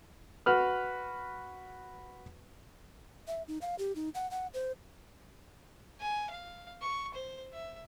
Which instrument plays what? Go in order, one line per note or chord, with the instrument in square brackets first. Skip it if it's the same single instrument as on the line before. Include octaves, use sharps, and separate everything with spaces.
[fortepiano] F#4 B4 F6
[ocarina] E5
D#4
F5
G4
D#4
F#5
F#5
C5
[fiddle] G#5
F5
C#6
C5
E5